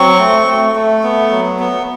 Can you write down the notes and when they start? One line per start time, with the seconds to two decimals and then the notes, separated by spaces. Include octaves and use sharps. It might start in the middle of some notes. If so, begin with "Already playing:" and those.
Already playing: F#3 C4 C#6
0.19 A3
0.47 A3
0.75 A3
1.03 B3
1.31 F#3
1.59 B3